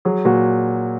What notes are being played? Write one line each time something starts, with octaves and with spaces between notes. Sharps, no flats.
F#3 G#4
A#2 F#4